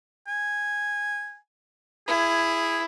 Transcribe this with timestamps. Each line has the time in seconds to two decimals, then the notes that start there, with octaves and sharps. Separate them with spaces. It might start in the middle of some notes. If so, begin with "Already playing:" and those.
0.28 G#5
2.08 E4 G#4